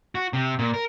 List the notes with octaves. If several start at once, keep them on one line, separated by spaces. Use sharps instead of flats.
F#4
C3
A#2
A#4